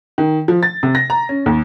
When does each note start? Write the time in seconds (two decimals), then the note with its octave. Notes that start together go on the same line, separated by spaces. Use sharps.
0.18 D#3
0.48 F3
0.63 A6
0.83 C3
0.95 A#6
1.10 A#5
1.29 C#4
1.46 D#2